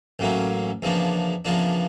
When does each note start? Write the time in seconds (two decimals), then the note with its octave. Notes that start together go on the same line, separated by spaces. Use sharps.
0.19 A1 A2 F#3 A#3 C#4
0.82 E2 C#3 F3 A#3 D4
1.45 E2 C#3 F3 A#3 D4